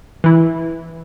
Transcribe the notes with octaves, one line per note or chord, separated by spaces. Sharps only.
E3 E4